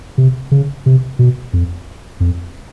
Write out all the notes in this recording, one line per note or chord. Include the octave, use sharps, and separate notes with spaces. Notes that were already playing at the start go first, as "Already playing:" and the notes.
C3
C#3
C3
B2
F2
F2